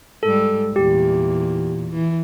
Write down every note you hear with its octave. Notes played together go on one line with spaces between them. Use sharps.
G#2 G3 A4
E2 A#2 G4
E3